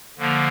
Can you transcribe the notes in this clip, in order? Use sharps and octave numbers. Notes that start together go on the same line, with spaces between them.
D3 F3 A#3